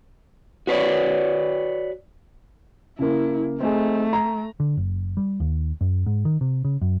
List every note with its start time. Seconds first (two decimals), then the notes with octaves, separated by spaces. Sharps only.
0.67 F#4 B4 C#5 D5
2.99 C#3 A#3 E4
3.60 A3 C4 D#4 G#4
4.13 A#5
4.60 D3
4.77 F#1
5.17 G3
5.40 D#2
5.81 F#2
6.06 G#2
6.25 D#3
6.41 C3
6.65 C#3
6.82 F#2